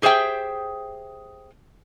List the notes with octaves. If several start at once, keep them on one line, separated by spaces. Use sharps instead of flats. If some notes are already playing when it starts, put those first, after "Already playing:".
G4 G#4 C5 E5 G5